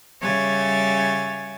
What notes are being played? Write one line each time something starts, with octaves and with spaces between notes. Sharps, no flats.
C#3 G3 C#5 E5 G#5 A6